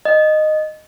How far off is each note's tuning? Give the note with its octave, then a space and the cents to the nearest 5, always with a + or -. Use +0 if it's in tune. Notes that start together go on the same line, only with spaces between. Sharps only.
D#5 -10